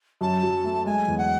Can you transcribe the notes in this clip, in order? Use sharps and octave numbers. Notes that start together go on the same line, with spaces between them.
F#2 A5
F#3
A3
G#3 G#5
E2
F#5